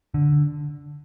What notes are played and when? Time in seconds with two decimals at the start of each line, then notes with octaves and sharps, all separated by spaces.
0.14 D3